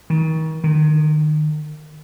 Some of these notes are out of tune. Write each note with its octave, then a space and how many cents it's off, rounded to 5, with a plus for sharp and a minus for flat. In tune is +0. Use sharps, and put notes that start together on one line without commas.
D#3 +35
D#3 -30